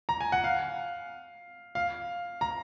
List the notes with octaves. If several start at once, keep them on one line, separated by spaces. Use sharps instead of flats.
A#5
G#5
F#5
F5
F5
A#5